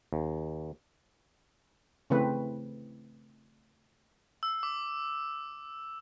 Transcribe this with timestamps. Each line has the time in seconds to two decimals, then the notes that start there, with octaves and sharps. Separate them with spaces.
0.13 D#2
2.10 C#3 E3 A3 C4 B4
4.43 E6
4.63 D6